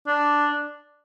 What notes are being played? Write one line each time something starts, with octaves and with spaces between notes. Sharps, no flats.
D4